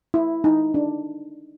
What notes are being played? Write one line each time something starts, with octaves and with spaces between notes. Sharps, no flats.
E4
D#4
D4